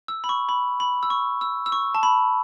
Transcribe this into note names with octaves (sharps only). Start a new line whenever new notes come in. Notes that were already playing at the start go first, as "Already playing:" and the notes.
E6
B5
C#6
B5
B5
E6
C#6
E6
E6
C#6
A5
B5